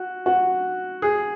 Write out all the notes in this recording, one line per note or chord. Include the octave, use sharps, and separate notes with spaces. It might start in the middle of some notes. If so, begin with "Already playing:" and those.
Already playing: F#4
F#4
G#4